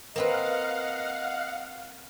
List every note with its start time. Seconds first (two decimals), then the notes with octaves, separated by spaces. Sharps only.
0.16 A#3 C4 B4 D#5 F5 F#5